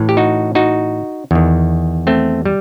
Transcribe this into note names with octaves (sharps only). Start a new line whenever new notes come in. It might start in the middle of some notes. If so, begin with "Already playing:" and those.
Already playing: A2 E3
G4
D#4 F#4
D#4 F#4
E2 D#3
A3 C4
G3